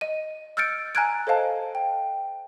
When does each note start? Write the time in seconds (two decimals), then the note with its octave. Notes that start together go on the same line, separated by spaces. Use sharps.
0.01 D#5 D#7
0.57 E6 F6 G6 A6 C#7 D7
0.95 G#5 A#5 F6 F#6 G#6 D7
1.27 A4 C5 D#5 F5 A5
1.75 G5